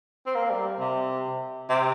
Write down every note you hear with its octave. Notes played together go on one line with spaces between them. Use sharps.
C4
A#3
G3
C3
C3